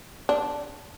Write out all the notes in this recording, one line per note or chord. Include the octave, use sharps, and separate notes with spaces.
D4